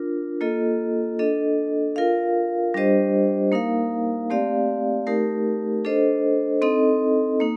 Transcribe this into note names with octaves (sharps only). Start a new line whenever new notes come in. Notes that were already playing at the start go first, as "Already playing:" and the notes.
Already playing: D4 F4 A#4
A#3 F4 A4 D#5
D4 A4 D#5
F4 A#4 F5
G3 D4 G4 C5 D#5
A#3 D#4 A#4 F5
A3 C4 G4 D5 F5
A3 D#4 G4 A#4
D4 A4 C5 D#5
C4 D#4 A4 D#5
A#3 D#4